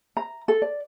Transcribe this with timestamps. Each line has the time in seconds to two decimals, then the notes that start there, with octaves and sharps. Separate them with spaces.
0.17 A#5
0.48 A4
0.62 D5